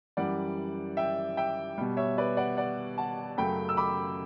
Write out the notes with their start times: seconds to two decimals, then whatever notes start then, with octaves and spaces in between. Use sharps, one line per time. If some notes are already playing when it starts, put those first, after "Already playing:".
0.17 F#2 E3 G3 D5 F#5
0.97 E5 G5
1.37 E5 G5
1.78 B2 G3
1.97 C#5 E5
2.18 B4 D5
2.37 D5 F#5
2.57 D5 F#5
2.98 F#5 A5
3.38 F#2 C#3 F#3 A3 G5 B5
3.69 E6
3.77 B5 D6